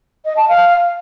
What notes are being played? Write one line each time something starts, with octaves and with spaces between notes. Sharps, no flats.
D#5
A5
F5